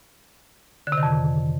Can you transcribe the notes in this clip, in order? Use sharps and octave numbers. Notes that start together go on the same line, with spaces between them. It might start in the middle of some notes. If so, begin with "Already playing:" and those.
D3
C3
D#3
F2